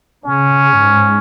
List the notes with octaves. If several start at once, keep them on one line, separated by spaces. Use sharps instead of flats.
C#3 C#4
G#2